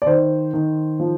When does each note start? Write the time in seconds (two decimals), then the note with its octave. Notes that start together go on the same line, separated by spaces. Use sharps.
0.02 D5
0.06 D#3 C5
0.54 D#3
1.00 F3